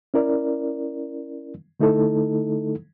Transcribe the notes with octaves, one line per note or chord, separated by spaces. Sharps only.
C#4 E4 A#4 D5
D3 A3 D#4 E4 A4